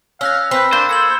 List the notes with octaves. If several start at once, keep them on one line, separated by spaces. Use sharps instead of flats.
C#4 F5 E6 F#6 A#6
C4 B4 B5 E6 G6
A#3 D4 C5 G6
A4 E6 G#6 F#7